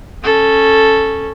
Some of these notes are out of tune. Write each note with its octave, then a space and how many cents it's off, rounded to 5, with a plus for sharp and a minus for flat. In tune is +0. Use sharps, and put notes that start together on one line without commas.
C#4 -5 A4 +0